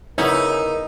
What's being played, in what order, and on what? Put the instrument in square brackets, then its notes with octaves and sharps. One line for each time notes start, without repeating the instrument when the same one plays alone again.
[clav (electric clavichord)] C#3 C#4 [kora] B3 E4 [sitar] D#4 [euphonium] A#4